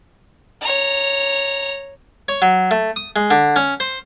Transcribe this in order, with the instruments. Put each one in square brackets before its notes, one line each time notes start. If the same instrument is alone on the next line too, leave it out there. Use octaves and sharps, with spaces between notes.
[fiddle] C#5 A#5
[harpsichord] C#5
F#3
A3
D#6
G#3
D3
C#4
C5